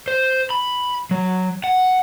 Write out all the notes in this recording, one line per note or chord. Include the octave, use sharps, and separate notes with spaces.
C5
B5
F#3
F#5